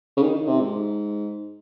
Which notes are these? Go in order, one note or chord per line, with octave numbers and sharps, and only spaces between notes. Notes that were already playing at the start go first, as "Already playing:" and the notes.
C#3
D#3
D#3
C3
G#2